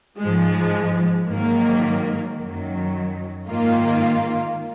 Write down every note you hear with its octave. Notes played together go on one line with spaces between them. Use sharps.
G#2 F3 G#3
G#2 D#3 F#3 A#3
F#2 D#3 F#3
G#2 D#3 A#3 F4